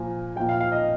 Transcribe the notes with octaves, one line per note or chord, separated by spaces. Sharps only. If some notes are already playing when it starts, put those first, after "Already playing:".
Already playing: A#2 F3 G#5
A#2 F3 G5
F5
F5
D#5